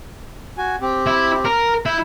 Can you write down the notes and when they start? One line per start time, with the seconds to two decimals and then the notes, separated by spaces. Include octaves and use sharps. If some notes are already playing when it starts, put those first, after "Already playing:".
0.58 F#4 G#5
0.81 C4 G4
1.07 E4
1.45 A#4
1.86 E4 G6